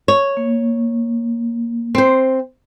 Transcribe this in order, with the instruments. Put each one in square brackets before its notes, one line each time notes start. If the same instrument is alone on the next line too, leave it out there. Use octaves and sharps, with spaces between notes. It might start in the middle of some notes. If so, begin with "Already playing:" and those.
[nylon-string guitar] C#5
[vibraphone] A#3
[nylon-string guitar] C4 C5